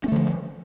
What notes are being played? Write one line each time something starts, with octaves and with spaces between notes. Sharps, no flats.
D3 F3 A3 C#4